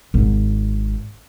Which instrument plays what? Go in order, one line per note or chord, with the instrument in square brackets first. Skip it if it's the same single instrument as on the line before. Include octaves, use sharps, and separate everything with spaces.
[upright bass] G#1